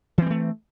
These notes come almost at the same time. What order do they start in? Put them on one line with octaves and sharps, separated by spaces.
E3 C4 G3 A3